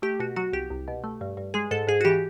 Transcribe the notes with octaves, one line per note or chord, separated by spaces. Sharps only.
A3 G4
B2 F#4
F#3 F#4
C2 G4
C2
B2
A3
G2
G2
G#3 G#4
G#2 A4
G#2 G#4
F#4
E3 G4